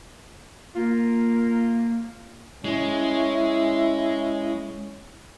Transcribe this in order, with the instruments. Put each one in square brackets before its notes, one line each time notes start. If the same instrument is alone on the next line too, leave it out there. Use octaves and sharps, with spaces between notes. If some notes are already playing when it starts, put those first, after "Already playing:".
[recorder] A#3 [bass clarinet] F4
[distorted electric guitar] G#3 [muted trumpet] C#4 [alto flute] E4